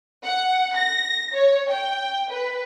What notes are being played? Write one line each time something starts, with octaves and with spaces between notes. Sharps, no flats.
F#5
A#6
C#5
G5
B4